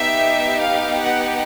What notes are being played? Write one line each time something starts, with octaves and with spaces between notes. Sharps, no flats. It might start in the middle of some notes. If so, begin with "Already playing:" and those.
Already playing: B3 D#4 G4 E5
F5
F#5